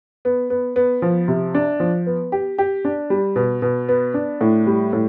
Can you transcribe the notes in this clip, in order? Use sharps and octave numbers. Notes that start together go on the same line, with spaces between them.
B3
B3
B3
F3
C3
D4
F3
B3
G4
G4
D4
G3
B2
B2
B3
D4
A2
G3
A2